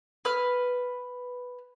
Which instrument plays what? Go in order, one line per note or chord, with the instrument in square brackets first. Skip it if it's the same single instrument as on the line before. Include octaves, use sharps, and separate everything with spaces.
[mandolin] B4 F6